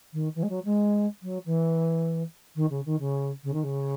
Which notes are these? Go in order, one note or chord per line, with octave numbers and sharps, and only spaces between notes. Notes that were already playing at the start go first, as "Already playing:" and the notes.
D#3
E3
G#3
F#3
G#3
F#3
E3
D#3
C#3
D#3
C#3
C#3
D#3
C#3